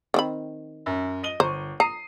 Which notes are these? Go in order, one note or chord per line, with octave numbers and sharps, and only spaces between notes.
D#3 C4 B5
F#2
D#5 D#7 G7
G1 C5 A#5 C#6
A#5 D#6 C7 D#7